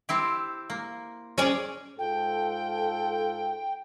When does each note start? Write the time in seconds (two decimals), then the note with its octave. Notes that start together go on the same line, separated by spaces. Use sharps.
0.09 C4 E4 G4
0.70 A#3
1.38 C#4 G#4 D5
1.99 G#2 F4 A4 G5